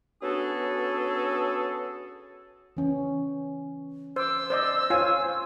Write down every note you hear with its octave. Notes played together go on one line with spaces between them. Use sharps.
B3 C#4 D4 F#4 G#4 A4
E3 C#4
C5 D6 E6
C5 D5 D#5
F4 C5 C#5 G#5